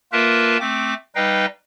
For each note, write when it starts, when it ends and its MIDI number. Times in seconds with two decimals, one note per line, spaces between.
0.12 0.58 58
0.12 0.58 65
0.12 0.58 70
0.12 0.58 71
0.12 0.58 76
0.12 0.58 81
0.60 0.94 57
0.60 0.94 60
0.60 0.94 86
1.15 1.46 55
1.15 1.46 63
1.15 1.46 71
1.15 1.46 75
1.15 1.46 77
1.15 1.46 79